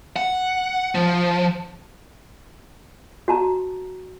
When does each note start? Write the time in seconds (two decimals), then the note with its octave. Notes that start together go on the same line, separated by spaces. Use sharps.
0.16 F#5
0.95 F3
3.28 F#4 A5 A#5